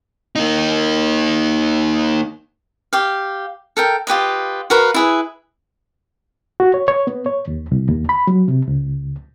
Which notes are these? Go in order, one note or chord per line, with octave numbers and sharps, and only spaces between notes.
A#3 D#4
G4 F5
A4 A#4 G5
F4 G4 B4 D#5
F#4 A#4 B4 F5
E4 G#4 B4
F#4
C#5
C#5
B3
C#5
D#2
C2
D#2
B5
F#3
C3
C#2